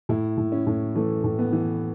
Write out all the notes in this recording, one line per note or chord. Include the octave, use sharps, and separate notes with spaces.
A2 E4
A2
C#4
A2
E3 A3
A2
B3
E3